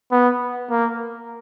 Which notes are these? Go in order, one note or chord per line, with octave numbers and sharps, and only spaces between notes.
B3
A#3